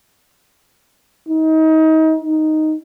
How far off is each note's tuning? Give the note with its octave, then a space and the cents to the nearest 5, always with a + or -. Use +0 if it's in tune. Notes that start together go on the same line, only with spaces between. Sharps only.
D#4 +30
D#4 +0